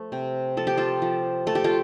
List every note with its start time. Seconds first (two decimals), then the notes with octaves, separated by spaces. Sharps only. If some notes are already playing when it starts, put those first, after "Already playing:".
Already playing: F3 A3
0.12 C3
0.57 F3 A4
0.67 G4
0.77 F4 A4
1.02 F3
1.47 A3 A4
1.55 G4
1.64 F4 A4